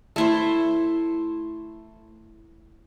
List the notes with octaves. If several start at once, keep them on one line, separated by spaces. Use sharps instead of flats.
A3 E4 C5